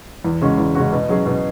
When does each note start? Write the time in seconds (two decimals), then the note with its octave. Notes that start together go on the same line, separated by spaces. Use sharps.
0.25 E2
0.41 C#3 G#3 C#4 F#4
0.58 E2
0.75 C#3 G#3 C#4 F#4
0.92 B2
1.09 F#3 C#4 G#4
1.26 B2